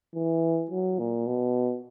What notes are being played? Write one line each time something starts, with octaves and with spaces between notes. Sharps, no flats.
E3
F#3
A#2
B2